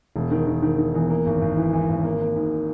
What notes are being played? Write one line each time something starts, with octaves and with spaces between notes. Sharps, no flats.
E1
D#3
D#3
D#3
D#3
E2
A#3
G#1
G#1
E3
E3
G#1
A#3
A#3
G#2